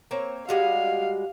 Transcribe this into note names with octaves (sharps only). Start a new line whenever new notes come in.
A#3 C4 C#5
G3 G#3 F#4 F5